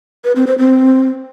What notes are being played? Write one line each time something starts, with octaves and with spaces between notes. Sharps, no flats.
B4
C4
C5
C4